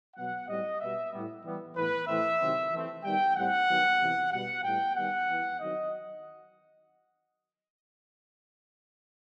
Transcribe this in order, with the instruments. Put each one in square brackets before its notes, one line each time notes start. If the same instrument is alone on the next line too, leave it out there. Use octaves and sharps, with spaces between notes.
[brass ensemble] B2 F#3 B3 F#5
A2 G3 C4 D#5
B2 G3 B3 E5
A2 G3 B3
E3 G3 B3
A2 E3 B3 B4
A2 E3 A3 C4 E5
C3 D#3 F#3 C4
E3 A3 C4
D#3 G3 B3 G5
A2 G3 C4 F#5
D#3 F#3 B3
C3 E3 B3
B2 G3 B3 F#5
A2 G3 B3 G5
D#3 G3 B3 F#5
E3 B3
D#3 F#3 C4 D#5